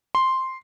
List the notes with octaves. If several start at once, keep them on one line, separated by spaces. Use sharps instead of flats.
C6